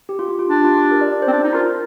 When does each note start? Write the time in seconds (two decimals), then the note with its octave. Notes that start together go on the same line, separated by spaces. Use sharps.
0.09 G4
0.19 F4
0.29 G4
0.39 F4
0.49 D4 G4
0.64 F4
0.77 G4
0.91 A#4
1.01 D5
1.12 D5
1.22 C5
1.27 C4
1.33 D4 C5
1.44 D#4
1.54 F4 A#4